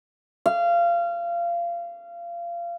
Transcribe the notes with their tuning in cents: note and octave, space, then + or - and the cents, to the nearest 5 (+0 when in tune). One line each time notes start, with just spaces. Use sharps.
F5 -25